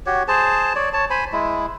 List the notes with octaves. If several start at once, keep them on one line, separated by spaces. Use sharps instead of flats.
F#4 G4 C#5
G#4 C5 A5
C#5 D5
C#5 A5
C5 G#5 B5
G#3 E4